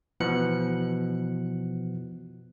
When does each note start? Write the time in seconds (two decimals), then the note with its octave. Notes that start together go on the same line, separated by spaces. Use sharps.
0.20 B2 E3 F3 B3 F#6 C#7